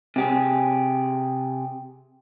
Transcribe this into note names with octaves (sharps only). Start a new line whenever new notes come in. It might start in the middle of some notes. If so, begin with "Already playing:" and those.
C3 G4 G#4